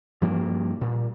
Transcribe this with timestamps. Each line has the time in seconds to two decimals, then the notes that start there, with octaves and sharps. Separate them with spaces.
0.21 G2 F3 G3 A#3
0.81 A#2